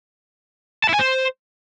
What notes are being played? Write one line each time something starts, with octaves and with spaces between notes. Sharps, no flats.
A5
E4
G#5
C5